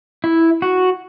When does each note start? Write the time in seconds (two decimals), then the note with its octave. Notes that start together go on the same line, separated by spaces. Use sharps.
0.24 E4
0.62 F#4